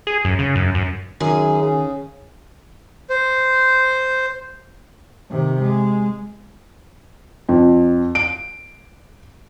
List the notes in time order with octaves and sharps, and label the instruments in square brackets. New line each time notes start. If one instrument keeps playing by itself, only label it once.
[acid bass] G#4
F#2
C#3
F#2
F#2
[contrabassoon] F#2 [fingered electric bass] D#3 [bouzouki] G#4
[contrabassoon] C#3
[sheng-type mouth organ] C5
[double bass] C3 D#3
G#3
[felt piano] F2
D7